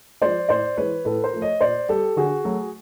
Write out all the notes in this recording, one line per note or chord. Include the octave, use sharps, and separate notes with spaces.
F3 G#3 C5 D5
A2 C5 D5
E3 G#3 B4 C#5
A2 A4 B4
A#4 C5
F3 A3
C#5 D#5
A#2 C5 D5
G3 G4 A4
D3 F#4 G#4
F#3 A3